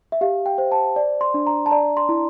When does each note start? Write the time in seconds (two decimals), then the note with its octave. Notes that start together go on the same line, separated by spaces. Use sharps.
0.12 E5
0.21 G4 F5
0.46 G5
0.58 C5
0.72 A5
0.96 D5
1.21 C6
1.34 D4
1.47 A#5
1.66 A5
1.71 D5 A#5
1.97 C6
2.09 E4